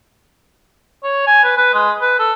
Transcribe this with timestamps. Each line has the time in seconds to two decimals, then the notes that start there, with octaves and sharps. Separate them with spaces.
1.04 C#5
1.27 G#5
1.43 B4
1.57 B4
1.74 G#3
2.01 B4
2.19 A4